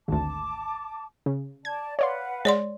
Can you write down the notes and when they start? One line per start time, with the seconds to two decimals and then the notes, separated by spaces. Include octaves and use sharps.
0.08 G#1 D2 A5 D6
1.26 C#3
1.65 D5 A5 G#6
1.99 B4 C#5 D5 F5 F#5 C6
2.45 G#3 C#5 D5 C6